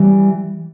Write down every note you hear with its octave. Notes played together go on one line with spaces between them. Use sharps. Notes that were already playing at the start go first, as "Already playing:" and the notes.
Already playing: E3 G3